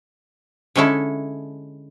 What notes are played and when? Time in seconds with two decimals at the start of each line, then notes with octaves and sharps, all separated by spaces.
0.75 D3 G#3 C#4 E4 A4